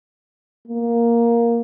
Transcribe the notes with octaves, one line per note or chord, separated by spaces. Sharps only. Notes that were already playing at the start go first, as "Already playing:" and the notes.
A#3